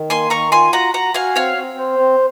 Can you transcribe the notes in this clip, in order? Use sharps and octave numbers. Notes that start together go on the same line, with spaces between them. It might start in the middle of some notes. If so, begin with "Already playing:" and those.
Already playing: D#3
A#3 G#5 C6
D#3 A#5 C#6
F4 G#5 C6
F#4 F#5 A#5
F#4 F#5 A#5
F#4 F5 G#5
C4 C#5 F5
C4
C5
C4